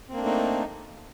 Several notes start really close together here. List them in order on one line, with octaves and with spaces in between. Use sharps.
C4 A#3 D4 A3 D#4